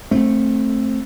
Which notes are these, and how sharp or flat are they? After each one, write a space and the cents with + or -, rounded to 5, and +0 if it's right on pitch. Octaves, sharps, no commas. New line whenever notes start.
A3 +0 C4 +15